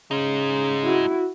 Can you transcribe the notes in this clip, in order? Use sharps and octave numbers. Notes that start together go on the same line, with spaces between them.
C#3 G#3 D#4
E4 F#4